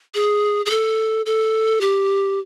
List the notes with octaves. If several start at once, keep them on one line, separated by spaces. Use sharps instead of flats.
G#4
G#4
A4
A4
G4